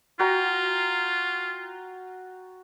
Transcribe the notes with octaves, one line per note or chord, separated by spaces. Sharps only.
F4 F#4 G5 A#5